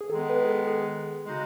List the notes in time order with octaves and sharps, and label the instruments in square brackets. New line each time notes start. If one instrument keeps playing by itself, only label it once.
[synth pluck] G#4
[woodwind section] D#3 G#3 B3 [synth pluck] A4
[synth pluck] B4
G#4
A4
G#4
[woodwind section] C#3 G#3 D#4 F#4